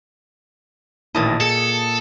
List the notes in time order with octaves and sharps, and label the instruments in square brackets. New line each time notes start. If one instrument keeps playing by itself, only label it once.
[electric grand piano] A1 D#3 E4 [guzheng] A#2 D#5 [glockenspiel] A5 D#6 A6
[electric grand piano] G#4 [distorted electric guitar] A4 [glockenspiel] C#7